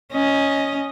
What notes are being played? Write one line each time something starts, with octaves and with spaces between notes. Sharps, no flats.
C#4 D#5